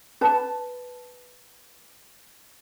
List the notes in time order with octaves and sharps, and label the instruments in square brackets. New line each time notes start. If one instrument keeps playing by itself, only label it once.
[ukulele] B4 A5